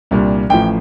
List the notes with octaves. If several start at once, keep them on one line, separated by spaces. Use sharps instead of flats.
C2 A#2 G3 D4
A1 A2 F3 G5